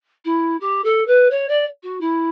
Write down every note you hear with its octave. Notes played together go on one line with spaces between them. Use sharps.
E4
G4
A4
B4
C#5
D5
F#4
E4